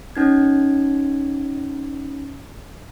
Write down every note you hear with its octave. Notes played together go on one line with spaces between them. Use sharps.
C#4 D#4 G#6